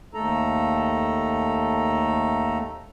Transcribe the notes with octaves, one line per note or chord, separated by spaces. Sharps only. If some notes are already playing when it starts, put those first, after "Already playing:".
D#2 A3 A4 A#5